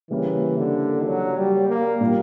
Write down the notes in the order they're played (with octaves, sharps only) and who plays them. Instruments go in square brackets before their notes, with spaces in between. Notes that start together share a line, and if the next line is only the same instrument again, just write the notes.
[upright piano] C#3 G3 A#3 C#4 E4 [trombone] E3
[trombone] D3
F#3
G3
A#3
[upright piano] A#2 G3 A#3